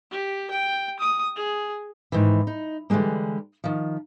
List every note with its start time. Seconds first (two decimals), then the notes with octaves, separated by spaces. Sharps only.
0.11 G4
0.51 G5
0.99 D#6
1.36 G#4
2.12 G#2 D#3 E3
2.47 D#4
2.90 D3 E3 G3 G#3 A#3
3.64 D#3 F3